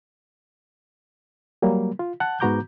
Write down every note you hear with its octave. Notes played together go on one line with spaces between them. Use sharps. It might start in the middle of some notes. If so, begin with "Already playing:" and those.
F#3 G3 A#3
F4
F#5 A5 F#6
G#2 B3 F#4 A#5 D6 G6